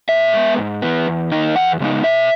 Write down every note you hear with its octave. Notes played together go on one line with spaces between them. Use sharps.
A#2 E5
G#3 B3
G#2
E3 B3
E2
D#3 A#3 D#4
E2 F#5
C#3 G#3 B3 D#4
B2 E5